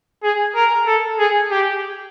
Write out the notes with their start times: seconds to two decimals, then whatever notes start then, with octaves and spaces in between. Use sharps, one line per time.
0.23 G#4
0.55 A#4
0.87 A4
1.19 G#4
1.51 G4